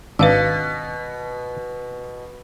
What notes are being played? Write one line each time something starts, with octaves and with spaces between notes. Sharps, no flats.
G#1 B2 D4 B4 F5 E6